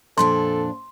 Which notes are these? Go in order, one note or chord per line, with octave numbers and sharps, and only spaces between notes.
F2 A#2 D4 A4 C6